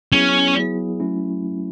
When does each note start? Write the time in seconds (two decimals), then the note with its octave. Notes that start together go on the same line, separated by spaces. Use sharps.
0.12 F#3 B3 C#4 E4 G#4
0.56 F#3 B3 E4 G#4
1.00 F#3 A3 C#4 E4